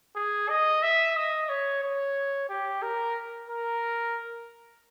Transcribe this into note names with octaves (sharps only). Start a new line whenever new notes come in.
G#4
D#5
E5
D#5
C#5
C#5
G4
A#4
A#4